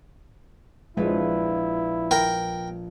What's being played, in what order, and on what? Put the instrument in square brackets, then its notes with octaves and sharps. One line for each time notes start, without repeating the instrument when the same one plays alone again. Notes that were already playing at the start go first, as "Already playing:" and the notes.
[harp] A#1 B4 [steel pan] F3 G#3 [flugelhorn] E4
[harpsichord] A#4 G5